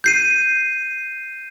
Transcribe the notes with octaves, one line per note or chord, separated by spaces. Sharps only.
G6 C7 D#7